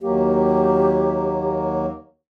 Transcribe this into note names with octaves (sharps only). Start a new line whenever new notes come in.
D#2 F#3 A#3 G4